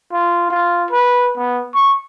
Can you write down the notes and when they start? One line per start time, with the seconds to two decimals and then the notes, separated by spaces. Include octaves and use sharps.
0.12 F4
0.50 F4
0.90 B4
1.37 B3
1.74 C#6